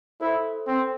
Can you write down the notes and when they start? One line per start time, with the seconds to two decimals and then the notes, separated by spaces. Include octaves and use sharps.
0.21 E4 A4 C5
0.67 C4